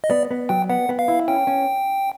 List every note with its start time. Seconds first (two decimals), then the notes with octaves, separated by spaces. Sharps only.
0.04 D#5
0.10 B3 D5
0.31 B3
0.49 F#3 G5
0.70 B3 F#5
0.89 B3
0.99 F5
1.08 E4
1.28 C#4 G5
1.47 C#4